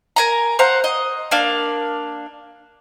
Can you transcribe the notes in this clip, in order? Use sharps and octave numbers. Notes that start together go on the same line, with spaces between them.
A#4 G#5 A#5
C5 F5 F#5 A#5
D#5
A#3 D4 F5